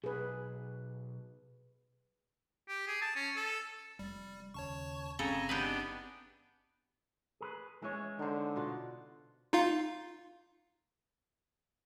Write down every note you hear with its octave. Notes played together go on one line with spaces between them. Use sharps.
B1 G#4 B4
G4
G#4
A5
C#4
A4
F1 G3
D#2 C#3 C#5 A5 C#6
G1 C#3 C4 A4 G#5 A#5
B3 D4 D#4 G4 G#4 B4
G#4 A#4 B4
E3 G#3 C#4 C#5
D3 D#4 C5
B2 F4 F#5
D#4 F4 F5